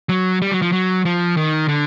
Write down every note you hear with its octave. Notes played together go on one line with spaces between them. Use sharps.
F#3
G3
F#3
F3
F#3
F3
D#3
D3